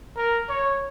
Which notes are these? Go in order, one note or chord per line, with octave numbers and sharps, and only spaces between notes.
A#4
C#5